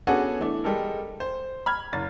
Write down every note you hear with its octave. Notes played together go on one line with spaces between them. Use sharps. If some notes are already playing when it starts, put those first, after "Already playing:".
B3 C#4 D4 F#4 G#4 A4
E3 A3 D4
G3 G#3 A4 A#4
C5
B5 F6 G#6
F#1 A6